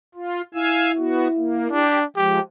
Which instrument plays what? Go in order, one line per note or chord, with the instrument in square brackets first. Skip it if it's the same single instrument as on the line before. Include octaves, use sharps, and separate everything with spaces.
[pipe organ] F4
[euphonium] E4 [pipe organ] F5 G#5 E6
[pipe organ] B3 F#4
A#3
[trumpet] D4 [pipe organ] G4
[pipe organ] F3 G#3 [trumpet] G4